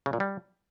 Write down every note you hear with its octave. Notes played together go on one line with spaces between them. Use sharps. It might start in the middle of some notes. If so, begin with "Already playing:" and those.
C#3
A#2
G3